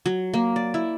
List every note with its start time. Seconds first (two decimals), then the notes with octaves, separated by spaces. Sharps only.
0.06 F#3
0.34 A#3
0.56 D5
0.74 E4